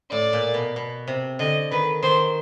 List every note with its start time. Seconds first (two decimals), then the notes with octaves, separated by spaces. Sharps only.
0.12 A2 D5
0.33 A#2
0.54 B2
0.76 B2
1.08 C3
1.39 D3 D#5
1.71 D#3 B4
2.03 D#3 C5